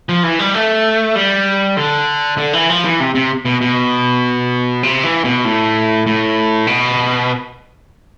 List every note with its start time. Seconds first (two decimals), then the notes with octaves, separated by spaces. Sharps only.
0.09 F3
0.23 E3
0.39 G3
0.54 A3
1.16 G3
1.77 D3
2.38 D3
2.53 E3
2.69 F3
2.85 E3
3.00 C3
3.15 C3
3.45 B2
3.61 B2
4.83 C3
5.03 E3
5.24 B2
5.45 A2
6.07 A2
6.67 B2